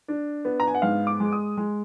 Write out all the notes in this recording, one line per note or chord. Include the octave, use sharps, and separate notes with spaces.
D4
B3
A#5
G#5
F#5
G#2 F5
D6
G#3
D#6
G#3